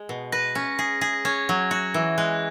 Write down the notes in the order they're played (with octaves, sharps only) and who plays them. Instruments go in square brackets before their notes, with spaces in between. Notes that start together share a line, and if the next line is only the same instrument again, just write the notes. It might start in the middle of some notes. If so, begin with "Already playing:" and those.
Already playing: [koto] G#3
B2
[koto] B4 [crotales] A#6
[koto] C#4
G#4
G#4
[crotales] A#6
[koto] C#4 [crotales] G#6
[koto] F#3
F#4
E3
[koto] G#3 [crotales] F#6